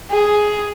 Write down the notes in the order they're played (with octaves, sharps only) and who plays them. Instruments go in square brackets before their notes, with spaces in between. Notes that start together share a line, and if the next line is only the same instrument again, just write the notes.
[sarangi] G#4